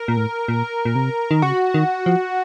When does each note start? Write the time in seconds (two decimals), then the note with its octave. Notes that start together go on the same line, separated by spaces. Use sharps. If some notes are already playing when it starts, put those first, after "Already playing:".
Already playing: A#4
0.08 A#2
0.17 A2
0.48 A#2
0.85 A#2
0.95 C3
1.31 D#3
1.42 C#3 F#4
1.74 D#3
2.06 F3